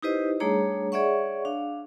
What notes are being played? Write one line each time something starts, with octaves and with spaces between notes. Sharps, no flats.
D#4 E4 G4 B4 C5 D#5
G3 A3 D4 G#4 C#5 A#5
G#4 C#5 D5 E5 F#5 C#6
D4 F5